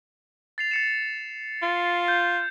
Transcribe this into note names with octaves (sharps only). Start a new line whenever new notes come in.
A6 C7 F7
A6 C#7 E7
F4
G6